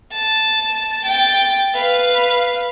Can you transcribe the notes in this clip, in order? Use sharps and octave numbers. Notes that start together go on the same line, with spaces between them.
A5
G5 A6
B4 F5